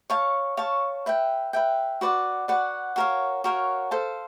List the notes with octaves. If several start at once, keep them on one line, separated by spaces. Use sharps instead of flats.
C#5 F5 A5 C#6
C#5 F5 A5 C#6
B4 E5 G5
B4 E5 G5
F#4 B4 D5 F#5
F#4 B4 D5 F#5
F#4 A#4 C#5 F5
F#4 A#4 C#5 F5
A4 C5 F5 A5